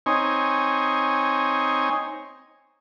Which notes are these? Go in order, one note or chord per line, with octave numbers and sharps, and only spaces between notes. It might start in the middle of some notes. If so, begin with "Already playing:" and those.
C4 D#4 C#5 G#5